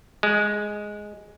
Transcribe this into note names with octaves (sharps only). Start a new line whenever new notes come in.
G#3